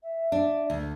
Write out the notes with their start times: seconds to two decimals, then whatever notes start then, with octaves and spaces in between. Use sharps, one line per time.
0.02 E5
0.32 D4
0.70 D2